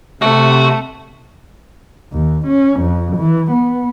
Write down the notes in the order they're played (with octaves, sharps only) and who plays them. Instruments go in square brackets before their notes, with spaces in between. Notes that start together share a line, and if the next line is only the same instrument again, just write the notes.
[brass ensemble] C3 [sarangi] A3 [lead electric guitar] F#4
[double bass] D#2
C#4
F2
E3
B3